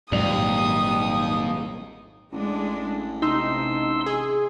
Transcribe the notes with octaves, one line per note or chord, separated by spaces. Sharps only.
G#1 D#2 A#2 F#3 G3 D5 D#6 F7
A1 G#3 D4
C3 D#4 C6 E6
G#4